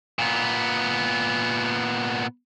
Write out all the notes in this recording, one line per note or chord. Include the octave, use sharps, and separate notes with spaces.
A#2 B3